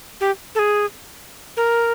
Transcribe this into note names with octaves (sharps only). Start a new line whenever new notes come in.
G4
A4
G#4
A#4